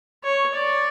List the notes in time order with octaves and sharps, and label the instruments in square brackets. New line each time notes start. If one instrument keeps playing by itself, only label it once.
[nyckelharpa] C#5
D5